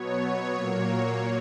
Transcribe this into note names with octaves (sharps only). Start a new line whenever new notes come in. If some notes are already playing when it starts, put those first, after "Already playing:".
Already playing: B2 F#3 B3 C#5
C#5
A#2 F#3 A#3